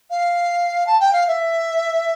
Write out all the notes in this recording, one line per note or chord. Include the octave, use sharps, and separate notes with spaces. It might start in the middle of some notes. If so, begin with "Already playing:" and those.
F5
A5
G5
F5
E5